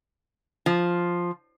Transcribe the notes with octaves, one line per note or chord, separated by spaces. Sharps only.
F3